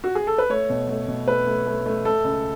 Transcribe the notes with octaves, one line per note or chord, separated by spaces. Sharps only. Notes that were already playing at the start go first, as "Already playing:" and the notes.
F#4
G#4
A4
B4
A3 C#5
B2
A3
B2
A3 B4
A3
A3
A3
A3 A4
C#2